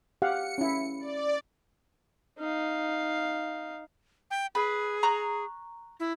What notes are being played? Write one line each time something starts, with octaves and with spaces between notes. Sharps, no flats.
G4 F5 F#5 C#7
C#4 E4
D5
D#4 F5
G5
G#4 B4
A#5 C#6 F#6
E4